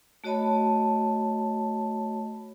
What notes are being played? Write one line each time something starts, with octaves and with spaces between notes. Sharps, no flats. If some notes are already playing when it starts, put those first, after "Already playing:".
A3 F#4 C#5 D#5 A5 B5